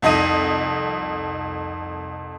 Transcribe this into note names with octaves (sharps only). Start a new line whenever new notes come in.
C2 F2 D#4 D#5 D#7